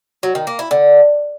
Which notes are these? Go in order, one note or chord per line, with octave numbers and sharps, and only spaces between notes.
F#3
D#3
A#3
E4
D3